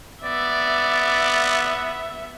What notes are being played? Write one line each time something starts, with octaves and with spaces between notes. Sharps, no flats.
B3 D5 E5